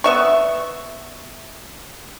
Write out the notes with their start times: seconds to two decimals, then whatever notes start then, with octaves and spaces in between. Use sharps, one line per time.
0.04 B3 E5 C#6